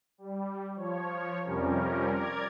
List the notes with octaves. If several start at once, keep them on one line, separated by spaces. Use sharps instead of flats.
G3
F3 C#5
F2 C3 F3 G3 C#4 A#4
A#4 D5 G#6